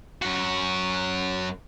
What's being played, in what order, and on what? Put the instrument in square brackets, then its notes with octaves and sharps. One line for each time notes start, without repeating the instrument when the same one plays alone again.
[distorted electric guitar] F#2 F#4